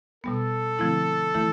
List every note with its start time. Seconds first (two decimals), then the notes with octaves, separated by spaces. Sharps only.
0.24 B2 G3 B3 A4
0.79 D3 F3 A3 C4 E4
1.34 E3 A3 E4